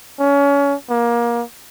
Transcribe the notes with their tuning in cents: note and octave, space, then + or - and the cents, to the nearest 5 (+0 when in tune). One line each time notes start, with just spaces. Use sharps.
C#4 +30
A#3 +25